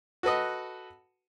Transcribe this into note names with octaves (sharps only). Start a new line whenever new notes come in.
F#4 A4 B4 D#5